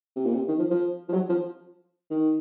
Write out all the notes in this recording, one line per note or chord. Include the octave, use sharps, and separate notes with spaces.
C3
A#2
C3
D#3
F3
F3
F3
F#3
F3
D#3